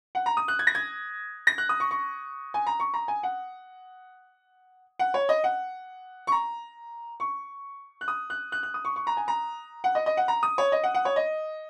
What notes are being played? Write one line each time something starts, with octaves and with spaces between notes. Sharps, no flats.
F#5
A#5
D#6
F#6
G#6
A#6
G#6
A#6
F#6
D#6
C#6
C#6
G#5
A#5
C#6
A#5
G#5
F#5
F#5
C#5
D#5
F#5
C#6
A#5
C#6
F#6
D#6
F#6
F#6
F#6
D#6
C#6
C#6
A#5
G#5
A#5
F#5
D#5
D#5
F#5
A#5
D#6
C#5
D#5
F#5
F#5
C#5
D#5